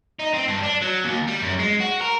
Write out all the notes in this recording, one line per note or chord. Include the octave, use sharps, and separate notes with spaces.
D#4
C4
G2
D4
F#3
D#2
G3
F#2
G#3
F#4
A#4